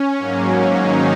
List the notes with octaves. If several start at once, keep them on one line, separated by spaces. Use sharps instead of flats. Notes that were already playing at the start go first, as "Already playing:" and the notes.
Already playing: C#4
G#2 F#3 A#3
D#3 D#4